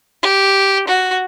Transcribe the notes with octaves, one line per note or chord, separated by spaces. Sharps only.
G4
F#4